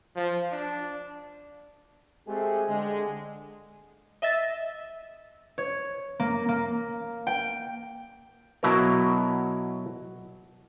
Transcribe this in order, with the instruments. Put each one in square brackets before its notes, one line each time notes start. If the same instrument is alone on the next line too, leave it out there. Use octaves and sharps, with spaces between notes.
[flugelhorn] F3
D4
[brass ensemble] G#3 A3 C4 G4 G#4
D3 G#3
[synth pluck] D#5 E5 E6 A6
[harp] C#5
A#3
A#3
G5
[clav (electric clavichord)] B2 F#3 E4 A#4